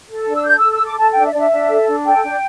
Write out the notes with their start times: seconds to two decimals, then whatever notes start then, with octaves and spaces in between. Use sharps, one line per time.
0.09 A4
0.26 D4
0.34 E6
0.45 A4 G6
0.58 E6
0.63 A4
0.72 E6
0.81 A4 D6
0.98 A4 A5
1.12 D4 G5
1.25 E5
1.33 D4 D5
1.39 E5
1.51 D4
1.69 A4
1.87 D4
2.05 A4 G5
2.23 D4